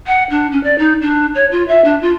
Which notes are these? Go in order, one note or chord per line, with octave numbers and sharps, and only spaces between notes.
F#5
D4
C#4
D5
D#4
D4
C#5
F4
E5
D4
F4